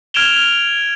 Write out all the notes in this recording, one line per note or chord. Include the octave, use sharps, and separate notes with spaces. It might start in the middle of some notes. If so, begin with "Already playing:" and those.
F6 G#6 D7 E7 F7 G7